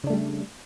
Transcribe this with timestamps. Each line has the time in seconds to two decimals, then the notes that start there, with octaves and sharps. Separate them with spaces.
0.04 C#3
0.07 D4
0.10 A3
0.13 G3